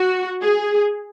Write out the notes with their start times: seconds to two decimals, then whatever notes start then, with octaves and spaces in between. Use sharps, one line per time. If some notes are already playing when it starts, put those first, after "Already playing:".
Already playing: F#4
0.42 G#4